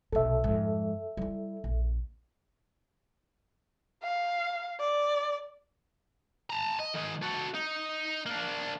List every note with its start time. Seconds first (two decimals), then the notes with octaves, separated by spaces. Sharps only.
0.12 B1 C3 A4 E5
0.44 F2 G#2
1.17 G3 E4
1.64 A#1
4.03 F5
4.80 D5
6.50 A5 A#5
6.80 D#5
6.95 D#3 G#4
7.23 F#4 A4
7.55 D#4
8.26 A#3 D4